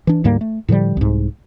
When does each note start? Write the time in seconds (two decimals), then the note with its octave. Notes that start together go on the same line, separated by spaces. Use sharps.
0.07 E3 D4
0.24 D2 G#2 G3 A#3
0.41 A3
0.68 A2 D3 F3 G3
0.97 C2 G#2